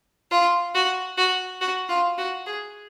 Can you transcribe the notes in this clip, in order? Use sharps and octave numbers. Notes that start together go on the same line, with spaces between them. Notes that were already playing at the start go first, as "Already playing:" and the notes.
F4
F#4
F#4
F#4
F4
F#4
G#4